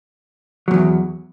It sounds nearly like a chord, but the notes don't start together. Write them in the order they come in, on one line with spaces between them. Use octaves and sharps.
F#3 G#2 E2